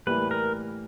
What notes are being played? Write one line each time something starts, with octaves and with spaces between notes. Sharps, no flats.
A2 E3 G3 A#3 B4
A#4